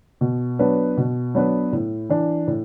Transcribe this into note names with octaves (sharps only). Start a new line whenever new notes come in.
B2
F#3 B3 D4 B4
B2
F#3 B3 D4 B4
A2
E3 D4
A2